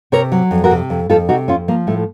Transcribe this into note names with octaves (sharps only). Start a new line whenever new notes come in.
C3 A#4 C#5
F#3
F2
F#4 A#4
C3
F2
F2 F4 A4
C3 D#4 F#4
F2 C#4 F4
F3 A#3
A2 A3